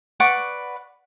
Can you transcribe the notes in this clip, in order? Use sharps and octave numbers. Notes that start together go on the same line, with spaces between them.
B4 D5 F#5 C#6